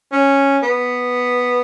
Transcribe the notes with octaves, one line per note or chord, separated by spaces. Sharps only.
C#4
B3